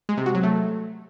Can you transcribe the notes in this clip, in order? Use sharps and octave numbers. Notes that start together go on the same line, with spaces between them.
G#3
C3
F#4
F#3
A3